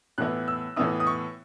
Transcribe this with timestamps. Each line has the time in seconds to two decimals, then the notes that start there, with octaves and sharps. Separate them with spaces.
0.18 A2 E3 B3 E4 F#6
0.48 E6
0.76 A2 E3 B3 E4 D#6
1.00 D#6
1.07 C#6